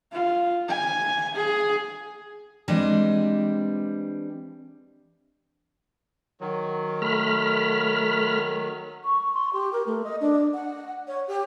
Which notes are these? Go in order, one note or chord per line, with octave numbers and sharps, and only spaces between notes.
F4
G#5
G#4
E3 G3 G#3 C4 D4 D#5
D#3 F#3
A3 B5 F6
C#6
C6
G4
A#4
A3
D#5
D4
F#5
C#5
G4